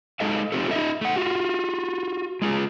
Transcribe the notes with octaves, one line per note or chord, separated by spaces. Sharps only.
G#3 D#4 A4 D#5 F5
C4 F4 G4 A4
D#4 F4 D#5 E5
A3 F#5
F4 F#4
G#3 F4 G#4